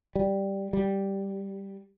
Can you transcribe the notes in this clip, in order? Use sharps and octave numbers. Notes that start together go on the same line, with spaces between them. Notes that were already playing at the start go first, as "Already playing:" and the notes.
G3
G3